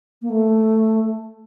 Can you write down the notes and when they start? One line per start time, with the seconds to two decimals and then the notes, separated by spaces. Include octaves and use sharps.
0.22 A#3
0.30 A3